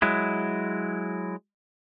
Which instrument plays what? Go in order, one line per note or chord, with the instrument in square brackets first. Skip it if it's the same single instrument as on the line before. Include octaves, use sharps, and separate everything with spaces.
[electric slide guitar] F#3 G#3 E4